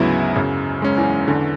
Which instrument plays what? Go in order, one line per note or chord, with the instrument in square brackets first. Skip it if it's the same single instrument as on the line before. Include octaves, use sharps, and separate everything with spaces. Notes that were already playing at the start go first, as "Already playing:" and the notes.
Already playing: [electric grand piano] D2 C#3 F#3 B3 E4 [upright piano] G#2 G#3
[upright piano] F#2 F#3 [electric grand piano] C#3
[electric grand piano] G#3 C#4
[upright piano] E2 E3
[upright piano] E2 E3 [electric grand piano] D3